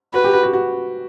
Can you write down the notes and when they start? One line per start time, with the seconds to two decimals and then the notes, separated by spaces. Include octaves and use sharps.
0.14 F#4 B4
0.24 G4
0.33 F#4
0.43 F#4
0.53 F#4